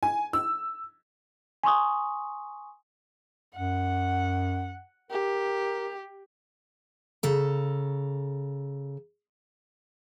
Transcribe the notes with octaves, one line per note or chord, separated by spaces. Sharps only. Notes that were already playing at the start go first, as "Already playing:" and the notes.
G#5
E6
G#5 C6 C#6 D#6
F#2 F#5
G4 A#4
C#3 A4 A#5